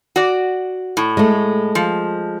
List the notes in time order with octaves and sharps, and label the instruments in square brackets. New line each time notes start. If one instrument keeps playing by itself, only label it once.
[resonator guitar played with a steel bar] F#4 D5
A2
[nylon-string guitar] G#3 A3
[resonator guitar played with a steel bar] F3